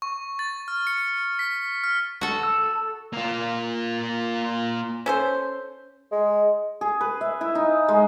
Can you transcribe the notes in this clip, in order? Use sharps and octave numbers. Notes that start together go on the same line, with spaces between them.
C#6
A6
F6
C#7
B6
F6
F#4 A4
E6
A#3 F4
C#4 A4 C5
G#3
G#4
B4
E5
E4
D#4
G#3